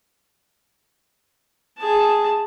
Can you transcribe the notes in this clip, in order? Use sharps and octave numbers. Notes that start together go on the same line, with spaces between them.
G#4 A5